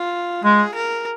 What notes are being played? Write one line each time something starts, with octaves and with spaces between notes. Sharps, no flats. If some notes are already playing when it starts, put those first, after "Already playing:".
Already playing: F4
G#3 G#4
A#4